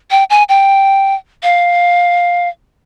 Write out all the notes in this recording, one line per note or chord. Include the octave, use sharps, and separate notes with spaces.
G5
G#5
G5
F5